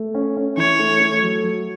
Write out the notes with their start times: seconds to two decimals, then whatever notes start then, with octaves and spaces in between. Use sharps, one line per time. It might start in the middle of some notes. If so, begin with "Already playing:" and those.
Already playing: A3
0.15 C#4
0.37 C#4
0.57 E3 C#5
0.79 A3
1.00 A3
1.22 F#3
1.44 F#3